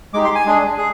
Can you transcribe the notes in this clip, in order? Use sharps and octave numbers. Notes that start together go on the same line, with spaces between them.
G#3 D#4 G4 D6
C6
G#5
G#3 D4 G#4
G#4